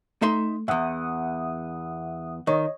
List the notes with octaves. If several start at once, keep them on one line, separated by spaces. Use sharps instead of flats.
A3 D#4 E5 C6
E2 G#2 E5 F#5 D#6
D#3 C#5 D#5